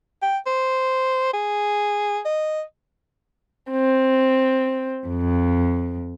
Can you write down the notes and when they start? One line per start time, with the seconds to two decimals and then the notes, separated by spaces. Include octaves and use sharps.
0.22 G5
0.47 C5
1.34 G#4
2.25 D#5
3.71 C4
5.06 F2